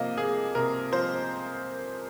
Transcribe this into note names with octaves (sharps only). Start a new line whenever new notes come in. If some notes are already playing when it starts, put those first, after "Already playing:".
Already playing: C3 F3 A#3 D#5 F5
A#3 G#4
C3 A#4
F3 C5